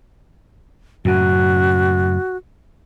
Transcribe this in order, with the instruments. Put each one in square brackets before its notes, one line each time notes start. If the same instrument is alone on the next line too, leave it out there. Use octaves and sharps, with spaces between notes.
[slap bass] F#2 A2 C#3 [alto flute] F#4